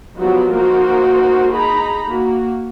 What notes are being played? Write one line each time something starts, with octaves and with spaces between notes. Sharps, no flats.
F3 F#3 B3 D#4 F#4 G4
A#3 D#4 F#4 A#4 C5
D#4 G#4 A#5 B5
A#3 F#4